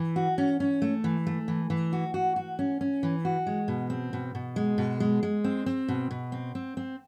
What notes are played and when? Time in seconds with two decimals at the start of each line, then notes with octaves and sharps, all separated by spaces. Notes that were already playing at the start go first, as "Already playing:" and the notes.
Already playing: E3
0.16 F#4
0.38 C#4
0.60 C#4
0.82 A3
1.04 E3
1.27 A3
1.48 E3
1.70 E3
1.93 F#4
2.14 F#4
2.36 F#4
2.59 C#4
2.81 C#4
3.03 E3
3.25 F#4
3.47 G#3
3.68 B2
3.90 C4
4.13 B2
4.35 B2
4.56 G#3
4.78 B2
5.00 G#3
5.23 G#3
5.44 C4
5.66 C4
5.88 B2
6.11 B2
6.32 C4
6.55 C4
6.77 C4